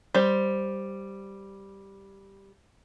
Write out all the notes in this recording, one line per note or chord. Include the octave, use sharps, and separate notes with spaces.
G3 C5